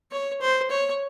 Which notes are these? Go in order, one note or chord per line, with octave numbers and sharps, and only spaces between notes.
C#5
C5
C#5